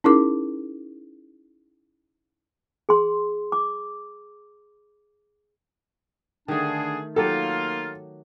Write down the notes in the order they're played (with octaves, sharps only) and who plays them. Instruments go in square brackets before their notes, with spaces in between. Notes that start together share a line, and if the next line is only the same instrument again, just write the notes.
[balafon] C#4 D#4 E4 G#4 A#4 D6
[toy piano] G#4 C6
D6
[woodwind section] D3 D4 G#4 [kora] D#3 A3
[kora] F#3 G4 C#5 [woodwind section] A#3 D#4 F4 [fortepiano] A4